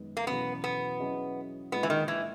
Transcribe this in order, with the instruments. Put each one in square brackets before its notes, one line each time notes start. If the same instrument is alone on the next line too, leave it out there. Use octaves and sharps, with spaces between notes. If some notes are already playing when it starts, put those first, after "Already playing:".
Already playing: [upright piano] F#2 D#3 G#3 B3
[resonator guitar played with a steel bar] A#3
[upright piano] E2 B2 F#3 C#4 [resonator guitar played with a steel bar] B3
[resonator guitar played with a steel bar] B3
[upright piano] F#3 C#4 E4 G#4 D#5
[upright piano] A#2 G#3 D#4 [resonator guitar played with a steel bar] B3
[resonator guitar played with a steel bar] E3
D#3
E3